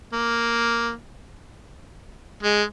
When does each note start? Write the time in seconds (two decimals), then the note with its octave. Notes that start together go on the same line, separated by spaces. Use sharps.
0.13 A#3
2.43 G#3